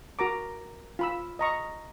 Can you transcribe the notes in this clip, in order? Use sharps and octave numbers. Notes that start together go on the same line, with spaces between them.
F#4 A#4 A#5 D6
F4 B5 E6
D#5 A#5 C#6